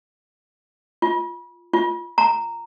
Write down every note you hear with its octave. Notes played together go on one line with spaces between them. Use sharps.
F4
F4
A#5